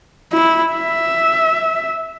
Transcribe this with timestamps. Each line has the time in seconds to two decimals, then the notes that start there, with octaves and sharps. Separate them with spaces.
0.33 E4
0.73 E5